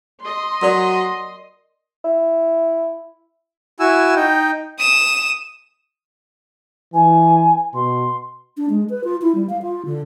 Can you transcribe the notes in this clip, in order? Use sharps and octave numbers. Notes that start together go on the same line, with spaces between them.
D#5 C6
F#3 A#4 D5
E4
E4 F#4 G#5 E6
D#4 G5
D#6 E7
E3 G#5
B2 C6
D4
G#3
B4
F4
E4
G3
F5
F4
D3